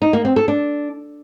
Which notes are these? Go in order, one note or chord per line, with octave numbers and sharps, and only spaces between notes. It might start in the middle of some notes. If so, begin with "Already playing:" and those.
D#4
A#3
C4
A4
D4